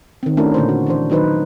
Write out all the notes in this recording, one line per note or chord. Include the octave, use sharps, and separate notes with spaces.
D#3 C4
A3 C#4 D4 E4 F#4 A#4
A#2 D3 C5
F#4
E3 D4 C5
D#3 F#3 D#4 B4 C5